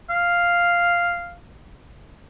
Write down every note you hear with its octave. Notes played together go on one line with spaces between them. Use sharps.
F5